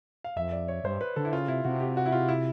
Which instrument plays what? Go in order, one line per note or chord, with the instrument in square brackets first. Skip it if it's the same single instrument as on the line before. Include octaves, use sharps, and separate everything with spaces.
[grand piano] F5
[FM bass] F2 [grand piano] E5
[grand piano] D5
C#5
[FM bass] G2 [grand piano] C5
[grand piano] B4
[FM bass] D3 [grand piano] A4
[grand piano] E4
[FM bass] C#3 [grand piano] F4
[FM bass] C3 [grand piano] E4
[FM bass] C3 [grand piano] F#4
[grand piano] G4
F#4
E4
F4
E4